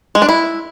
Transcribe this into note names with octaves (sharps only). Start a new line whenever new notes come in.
G#3
D4
E4